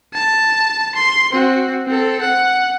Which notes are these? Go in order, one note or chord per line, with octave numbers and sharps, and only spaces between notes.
A5
C6
C4 F#4
C4 A4
F#5